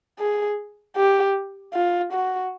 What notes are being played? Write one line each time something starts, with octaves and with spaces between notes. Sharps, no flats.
G#4
G4
F4
F#4